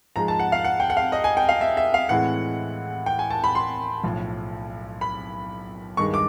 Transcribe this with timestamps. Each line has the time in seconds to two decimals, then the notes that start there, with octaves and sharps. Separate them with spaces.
0.16 G#2 F3 G#3 A#5
0.28 A5
0.39 F#5
0.52 F5
0.64 F#5
0.80 G5
0.90 F#5
0.97 F5
1.12 D#5
1.24 G#5
1.37 G5
1.49 F5
1.61 E5
1.77 E5
1.94 F5
2.09 A2 E3 G#3 C4 E4 F#5
3.06 G5
3.19 G#5
3.30 A5
3.44 B5
3.55 C6
4.04 B1 A2 F3
5.01 B5
5.97 G2 D#3 G#3 C#6
6.14 D6